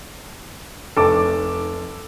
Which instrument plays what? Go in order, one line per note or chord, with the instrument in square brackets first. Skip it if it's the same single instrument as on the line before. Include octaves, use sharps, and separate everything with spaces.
[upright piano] F1 D#4 C#5 [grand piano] A4 D6